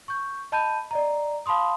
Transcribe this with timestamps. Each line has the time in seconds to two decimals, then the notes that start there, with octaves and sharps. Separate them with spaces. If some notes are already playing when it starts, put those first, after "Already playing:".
0.08 C#6 G6
0.52 D#5 A5 B5 G6 D#7
0.91 D5 D#5 A#5
1.46 F5 A5 B5 C6 D#6